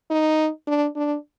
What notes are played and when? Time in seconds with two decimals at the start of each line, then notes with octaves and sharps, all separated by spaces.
0.10 D#4
0.67 D4
0.96 D4